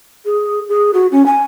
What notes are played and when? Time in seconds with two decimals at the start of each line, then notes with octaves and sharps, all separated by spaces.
0.25 G#4
0.68 G#4
0.93 F#4
1.11 C#4
1.25 G#5